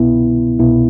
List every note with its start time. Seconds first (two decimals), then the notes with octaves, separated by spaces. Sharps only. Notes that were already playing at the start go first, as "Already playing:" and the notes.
Already playing: C2 B2 B3 E4
0.59 C2 B2 B3 E4